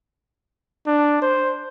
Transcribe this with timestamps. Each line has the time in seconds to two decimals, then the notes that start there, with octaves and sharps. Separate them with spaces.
0.87 D4
1.22 C5